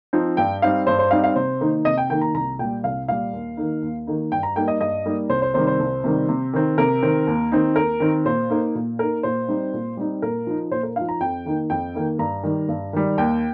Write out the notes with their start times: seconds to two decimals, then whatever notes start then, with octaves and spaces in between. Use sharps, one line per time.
0.13 F3 C4 D#4
0.37 G2 G5
0.62 G3 C4 D#4 F5
0.87 G2 C5
0.99 C5
1.11 G3 C4 D#4 F5
1.24 F5
1.36 C3 C5
1.61 D#3 A#3 D#4
1.85 C3 D#5
1.98 G5
2.10 D#3 A#3 D#4 G5
2.21 A#5
2.34 C2 A#5
2.59 A#2 G3 G5
2.84 C2 F5
3.08 A#2 G3 F5
3.33 D#2
3.57 D#3 A#3 D#4
3.82 D#2
4.07 D#3 A#3 D#4
4.32 G2 G5
4.43 A#5
4.56 G3 A#3 D#4 G5
4.68 D#5
4.81 G2 D#5
5.05 G3 A#3 D#4
5.29 C2 C5
5.42 C5
5.54 C3 D#3 G3 C5
5.67 C5
5.79 C2
6.04 C3 D#3 G3
6.29 C3
6.53 D#3 C4
6.78 C3 A#4
7.03 D#3 C4
7.27 D#2
7.52 D#3 C4 D#4
7.76 D#2 A#4
8.00 D#3 C4 D#4
8.25 A#2 C5
8.50 A#3 D#4
8.75 A#2
8.99 A#3 D#4 A#4
9.23 A#2 C5
9.48 G3 C4 D#4
9.74 A#2
9.97 G3 C4 D#4
10.22 A#2 A#4
10.47 F3 D#4
10.71 A#2 C5
10.83 A#4
10.96 F3 D#4 F5
11.09 A#5
11.21 F2 G5
11.45 D#3 A#3 D#4
11.70 F2 G5
11.95 D#3 A#3 D#4
12.19 G2 A#5
12.43 D#3 G3
12.69 G2
12.93 D#3 G3
13.18 D#2 G5